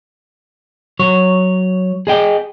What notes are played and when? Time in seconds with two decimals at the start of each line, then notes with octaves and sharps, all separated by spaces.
0.99 F#3 C#5
2.07 G#4 D#5 G5